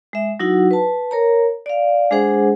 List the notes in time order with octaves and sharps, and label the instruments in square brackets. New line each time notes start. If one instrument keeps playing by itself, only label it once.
[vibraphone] G#3 E5
F#3 D#4 E4 F#4 F#5
B4 A5
A#4 C#5 A#5
D5 F5
G#3 D4 G#4 C5 F#5